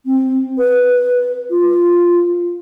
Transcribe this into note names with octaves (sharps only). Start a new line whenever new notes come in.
C4
B4
F4